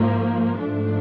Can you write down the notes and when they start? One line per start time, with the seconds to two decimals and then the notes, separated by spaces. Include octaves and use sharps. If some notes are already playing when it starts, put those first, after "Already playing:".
Already playing: G#2 F3 A#3
0.61 G#2 F3 A3 D4